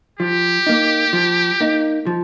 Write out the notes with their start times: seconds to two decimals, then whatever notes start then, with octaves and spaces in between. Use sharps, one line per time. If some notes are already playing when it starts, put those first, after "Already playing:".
0.19 F3 G4
0.67 A#3 D#4
1.13 F3
1.60 A#3 D#4
2.06 F3